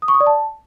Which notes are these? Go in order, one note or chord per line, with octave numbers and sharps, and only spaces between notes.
D#6
C#6
D#6
D5
A5